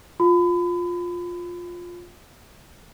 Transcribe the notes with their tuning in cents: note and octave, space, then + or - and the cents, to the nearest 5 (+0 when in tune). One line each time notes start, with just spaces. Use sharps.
F4 +10 B5 +35